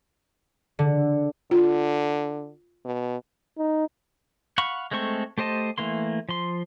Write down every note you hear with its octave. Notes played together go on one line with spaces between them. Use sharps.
D3
D3 F4
B2
D#4
F5 F#5 B5 C#6
G#3 A3 C4 A4 C#6
A3 G4 C5 D#5 A5
E3 A3 A#3 C6
F3 C6